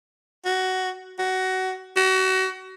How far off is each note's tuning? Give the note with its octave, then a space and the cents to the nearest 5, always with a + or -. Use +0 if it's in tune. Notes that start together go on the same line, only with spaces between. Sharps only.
F#4 +15
F#4 +20
F#4 +30